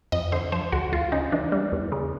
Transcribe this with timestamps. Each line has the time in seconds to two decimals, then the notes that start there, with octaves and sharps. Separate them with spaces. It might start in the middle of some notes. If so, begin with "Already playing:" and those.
0.12 F2 D#5
0.32 D3 C5
0.52 F3 C5
0.72 D2 F#4
0.92 D2 F4
1.12 C#3 D#4
1.32 E3 D4
1.52 G3
1.72 E2
1.92 C#3